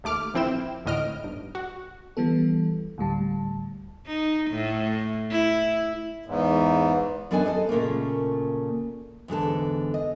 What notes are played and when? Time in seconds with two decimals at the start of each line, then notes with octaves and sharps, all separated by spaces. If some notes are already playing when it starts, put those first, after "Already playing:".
0.04 D#2 A3 D6 F6
0.34 A#1 F3 C4 E4 G5 E7
0.85 G#1 D2 A2 D#5 F6 D7
1.24 B1 G2
1.55 F#4
2.17 E3 G3 B3 A4
2.98 D2 A2 G3 A5
4.07 D#4
4.51 A2
5.31 E4
6.26 E2 G#2
7.31 F#2 B3 D4 A4 D#5 G#5
7.46 A4 C5 D#5
7.69 A#2 C#3 A3 A#3
9.28 E2 G#2 D3 A4
9.94 D#5